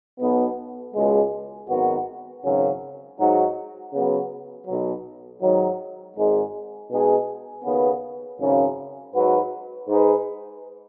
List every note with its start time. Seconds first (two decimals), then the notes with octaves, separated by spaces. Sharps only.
0.20 B1 B2 B3
0.95 C#2 B2 G#3
1.69 G#1 F#2 D#3 B3 F#4
2.44 G#1 F#2 C#3 F#3 C#4
3.19 G#2 F#3 D#4 F#4
3.93 C#3 F#3 B3
4.67 B1 B2 F#3
5.42 G#2 D#3 F#3
6.17 G#1 G#2 G#3
6.91 B2 G#3 D#4 G#4
7.65 D#2 C#3 B3
8.40 G#1 F#2 C#3
9.14 G#2 F#3 D#4 F#4 B4
9.88 G#2 G#3 D#4 G#4 B4